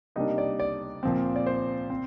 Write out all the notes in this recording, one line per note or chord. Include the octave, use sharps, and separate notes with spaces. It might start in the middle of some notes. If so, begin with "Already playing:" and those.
C3 G3 A#3 D4 D#4 D#5
D5
D5
A#2 F3 C4
D5
C5
C4